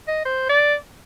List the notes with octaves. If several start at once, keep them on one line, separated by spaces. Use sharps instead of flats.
D#5
C5
D5